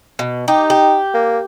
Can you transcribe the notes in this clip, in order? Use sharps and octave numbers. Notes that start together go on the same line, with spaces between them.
B2
D#4 G4
G4
A#3